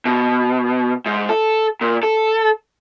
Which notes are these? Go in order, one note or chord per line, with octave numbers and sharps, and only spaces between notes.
B2
G#2
A4
A#2
A4